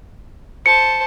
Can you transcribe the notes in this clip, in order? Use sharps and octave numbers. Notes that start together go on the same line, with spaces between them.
C5 A5 C#7